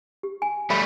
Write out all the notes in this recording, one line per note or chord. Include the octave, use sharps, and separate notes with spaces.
G4
G#5
G3 A3 C#5 E5 B5